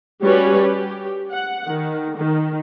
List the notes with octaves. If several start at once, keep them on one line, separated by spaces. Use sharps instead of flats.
G3 C#4 F#4 B4 C#5
G4
F#5
D#3
D#3